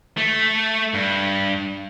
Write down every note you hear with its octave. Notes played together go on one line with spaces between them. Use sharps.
A3
G2